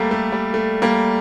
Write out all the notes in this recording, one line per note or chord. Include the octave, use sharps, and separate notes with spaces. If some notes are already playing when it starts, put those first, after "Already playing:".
Already playing: G3 A3 A#3
A3
G3
A3
G3 A#3